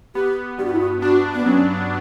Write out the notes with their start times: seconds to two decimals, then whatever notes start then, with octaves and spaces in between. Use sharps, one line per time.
0.15 B3 G4
0.58 G2 G4
0.65 F#4
0.73 E4
0.79 F#4
1.02 D4 F#4
1.34 B3
1.46 F#3 C#4